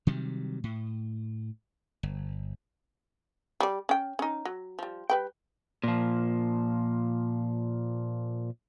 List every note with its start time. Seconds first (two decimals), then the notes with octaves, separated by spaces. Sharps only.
0.07 C3 D#3 F#3 G3
0.64 A2
2.03 G1
3.60 G3 D5
3.89 C#4 G5
4.19 C#4 D#4
4.45 F#3
4.79 F3 G3
5.10 G3 B4 G5
5.84 A#2 F3